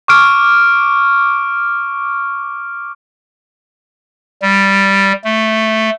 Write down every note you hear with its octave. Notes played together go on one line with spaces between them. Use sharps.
C#6 D6 F6 D7
G3
A3